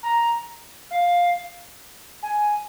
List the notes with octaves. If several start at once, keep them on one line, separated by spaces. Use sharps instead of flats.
A#5
F5
G#5